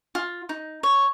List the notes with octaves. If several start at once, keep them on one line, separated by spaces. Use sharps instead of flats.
F4
D#4
C#5